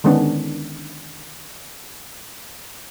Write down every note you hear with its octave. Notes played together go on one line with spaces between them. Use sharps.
D3 D#3 G#3 B3 C#4 D4